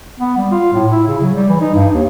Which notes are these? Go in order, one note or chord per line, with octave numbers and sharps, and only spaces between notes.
B3
G3
F4
A2
E4
C#3
F#3
G3
E3
D#4
G2
D#2